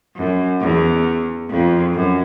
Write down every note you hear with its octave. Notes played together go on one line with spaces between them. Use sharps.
F#2
E2
F2
F#2